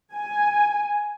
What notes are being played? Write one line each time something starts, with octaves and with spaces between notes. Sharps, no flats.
G#5